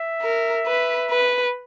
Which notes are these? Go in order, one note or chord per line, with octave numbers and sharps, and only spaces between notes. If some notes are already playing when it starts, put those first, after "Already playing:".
Already playing: E5
A#4
B4
B4